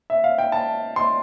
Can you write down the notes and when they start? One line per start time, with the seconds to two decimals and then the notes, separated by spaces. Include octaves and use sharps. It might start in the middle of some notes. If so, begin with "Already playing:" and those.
0.10 E5
0.24 F5
0.38 G5
0.52 A5
0.96 C6